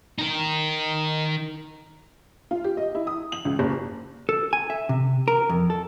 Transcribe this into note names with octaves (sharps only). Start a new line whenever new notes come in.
D#4 A#4
F4
G4
D#5
E4
D#6
F#7
C#2
F#1
A4
G#5
E5
C3
A#4
F2
A4